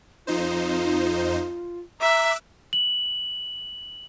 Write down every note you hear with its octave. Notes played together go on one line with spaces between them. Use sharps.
F2 D#4 F4 C5
E5 A#5 D6 E6 F#6
F#7